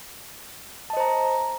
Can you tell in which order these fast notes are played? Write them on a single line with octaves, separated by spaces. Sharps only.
A5 D#5 C5 A#5